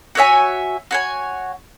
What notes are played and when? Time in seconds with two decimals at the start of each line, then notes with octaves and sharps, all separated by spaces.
0.15 F#4 C#5 E5 G#5
0.91 F#4 C#5 G#5